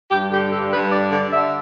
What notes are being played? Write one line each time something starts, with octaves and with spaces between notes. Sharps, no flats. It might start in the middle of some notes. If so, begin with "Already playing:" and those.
G2 G4
D3 G4
G2 A4
G2 B4
D4 D5
D3 D5
D3 E5